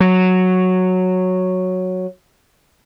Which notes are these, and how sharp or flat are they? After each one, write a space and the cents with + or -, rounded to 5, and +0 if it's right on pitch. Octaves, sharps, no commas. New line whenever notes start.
F#3 -5